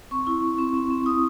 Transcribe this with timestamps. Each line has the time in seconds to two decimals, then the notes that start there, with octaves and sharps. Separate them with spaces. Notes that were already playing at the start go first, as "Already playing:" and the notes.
0.11 C4 C#6
0.27 E4
0.43 E4
0.58 C4
0.74 C4
0.91 C4
1.06 E4 D#6